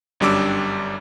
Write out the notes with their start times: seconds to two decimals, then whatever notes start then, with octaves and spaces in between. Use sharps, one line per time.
0.20 G1 F#2 G3 D4 D6 E6